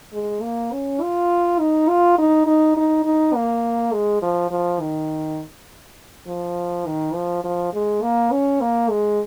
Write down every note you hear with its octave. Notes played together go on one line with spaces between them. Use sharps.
G#3
A#3
C#4
F4
D#4
F4
D#4
D#4
D#4
D#4
A#3
G#3
F3
F3
D#3
F3
D#3
F3
F3
G#3
A#3
C#4
A#3
G#3